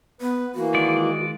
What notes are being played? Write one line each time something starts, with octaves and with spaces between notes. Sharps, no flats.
B3 B4
E3 A#3 F#4
D#3 G#3 D5